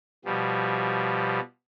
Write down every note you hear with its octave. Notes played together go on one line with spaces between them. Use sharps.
B2 F3 G3